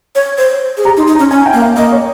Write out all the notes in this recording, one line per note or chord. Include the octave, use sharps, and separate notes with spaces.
C#5
C5
G#4
G4 A#5
D#4
C6
D#4
A#5
C#4
C#4 G#5
G5
A#3
F5
A#3 D#5
C#5